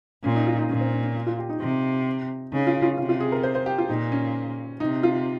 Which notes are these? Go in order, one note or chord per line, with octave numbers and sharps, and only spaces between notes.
A#2 C#4
D#4
F4
D#4
A#2 C#4
C4
C#4
C#4
F4
G4
D#4
C3
C#3 D#4
F4
F4
C3 F4
F4
G#4
A#4
C5
C5
G4
F4
A#2 D#4
C#4
C3 D#4
F4